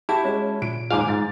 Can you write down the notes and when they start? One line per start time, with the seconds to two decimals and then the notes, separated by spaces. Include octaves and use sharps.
0.09 E4 F#4 G4 A5
0.24 G#3 C#4
0.62 A#2 D7
0.90 D#2 G#2 F4 F5 G#5 D6
1.08 G#2 A6